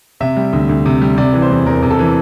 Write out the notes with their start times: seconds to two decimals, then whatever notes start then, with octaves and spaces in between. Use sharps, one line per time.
0.20 C3 E5
0.37 G3
0.53 D2
0.69 D2
0.86 C3
1.02 G3
1.18 C3 D5
1.34 E3
1.42 C5
1.50 E2
1.66 E2 A#4
1.82 C3
1.90 A4
1.99 E3